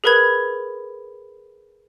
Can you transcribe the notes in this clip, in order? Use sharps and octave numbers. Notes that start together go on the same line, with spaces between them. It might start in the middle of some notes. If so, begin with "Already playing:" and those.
G#4 A#4 B4 B5 G#6